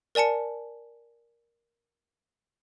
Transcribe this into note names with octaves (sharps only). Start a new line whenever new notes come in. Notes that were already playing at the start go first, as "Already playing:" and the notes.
A#4 D5 G#5 A5 C#7